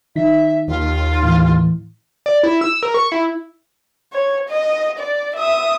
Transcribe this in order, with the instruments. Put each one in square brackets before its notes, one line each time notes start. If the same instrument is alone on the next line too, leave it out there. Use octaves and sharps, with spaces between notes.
[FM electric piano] D#3 D#4 B6 [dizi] E5
[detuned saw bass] D#2 [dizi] F4
[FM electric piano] A2 E3
[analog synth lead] D5
E4
E6
A#4
C#6
E4
[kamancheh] C#5
D#5
D5
E5 D#6